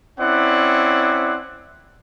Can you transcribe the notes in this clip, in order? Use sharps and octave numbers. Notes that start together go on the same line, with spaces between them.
C4 C#4 E4 D5 F#5